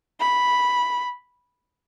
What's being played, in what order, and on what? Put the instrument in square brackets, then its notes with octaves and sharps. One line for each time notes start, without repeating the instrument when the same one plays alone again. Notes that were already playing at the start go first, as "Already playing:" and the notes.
[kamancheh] B5